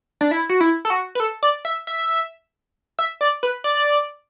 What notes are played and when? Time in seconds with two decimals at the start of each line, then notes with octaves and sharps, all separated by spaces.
0.21 D4
0.31 E4
0.49 F#4
0.61 E4
0.85 A4
0.90 F#4
1.15 B4
1.20 A4
1.43 D5
1.65 E5
1.87 E5
2.99 E5
3.21 D5
3.43 B4
3.64 D5